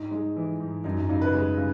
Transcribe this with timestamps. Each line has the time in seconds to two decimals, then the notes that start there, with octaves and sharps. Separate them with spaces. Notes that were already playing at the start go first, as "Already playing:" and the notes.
Already playing: G#2 D#4
0.11 G#3 D#4
0.36 E3
0.60 G#2
0.84 F#2 D#4
0.98 D#4
1.09 C#3 D#4
1.21 B4
1.34 G#3
1.57 C#3